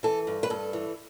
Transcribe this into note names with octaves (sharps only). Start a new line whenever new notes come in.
E3 A4
G2
B4
G2 A4
E3